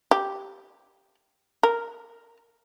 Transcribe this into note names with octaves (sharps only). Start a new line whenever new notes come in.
G4
A#4